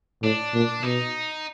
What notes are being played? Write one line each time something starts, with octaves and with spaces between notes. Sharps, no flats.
A2 D4
A#2
B2 D#4